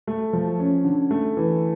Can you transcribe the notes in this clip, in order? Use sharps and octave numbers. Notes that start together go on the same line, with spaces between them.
A3
F3
C#4
D3
A3
E3